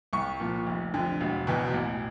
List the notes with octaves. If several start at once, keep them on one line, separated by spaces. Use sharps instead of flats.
C2 C#6
A#2 F3
F1
F2 D3
E1
E2 B2
A1